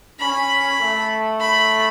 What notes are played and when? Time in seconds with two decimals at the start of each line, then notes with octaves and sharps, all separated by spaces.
0.19 C#4 B5
0.80 A3
1.40 B5